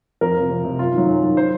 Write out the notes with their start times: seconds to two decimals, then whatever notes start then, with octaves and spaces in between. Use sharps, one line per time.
0.21 F2 A#4
0.35 F3
0.40 C3
0.50 F2
0.65 C3 F3
0.79 F#2 F4
0.94 D#3 F#3
1.08 F#2
1.23 D#3 F#3
1.37 C5